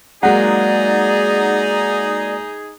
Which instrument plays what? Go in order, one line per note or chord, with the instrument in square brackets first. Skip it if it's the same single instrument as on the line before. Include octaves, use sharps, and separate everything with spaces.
[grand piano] F#3 G#3 A#3 [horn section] D#4 G#4 [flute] D5 [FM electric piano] F#5 A#5